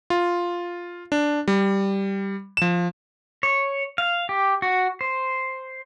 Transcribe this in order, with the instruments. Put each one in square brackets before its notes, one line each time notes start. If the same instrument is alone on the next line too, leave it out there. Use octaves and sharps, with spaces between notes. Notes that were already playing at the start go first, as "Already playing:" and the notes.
[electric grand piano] F4
D4
G3
F3 E7
[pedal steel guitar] C#5
F5
G4
F#4
C5